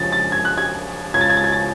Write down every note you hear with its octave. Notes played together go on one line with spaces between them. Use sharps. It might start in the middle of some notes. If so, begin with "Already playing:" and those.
Already playing: F2 C#3 A6
A6
G#6
F#6
G#6
C#2 C#3 G#6
A6
G#6
A6
G#6
A6